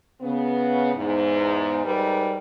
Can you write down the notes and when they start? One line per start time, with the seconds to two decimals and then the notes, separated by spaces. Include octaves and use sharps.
0.20 C#3 B3
0.94 E2 G#2
1.84 G#2 G3 A#4 B4